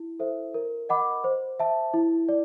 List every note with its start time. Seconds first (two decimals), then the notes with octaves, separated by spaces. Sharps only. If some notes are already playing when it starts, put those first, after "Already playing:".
Already playing: E4
0.20 A4 C5 E5
0.54 A#4
0.89 D#5 F#5 B5 D6
1.24 C5
1.59 E5 A5
1.94 E4
2.29 D5